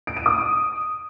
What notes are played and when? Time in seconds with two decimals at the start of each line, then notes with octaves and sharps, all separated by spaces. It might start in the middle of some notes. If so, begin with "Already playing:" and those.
0.07 D7
0.17 D#7
0.26 D#6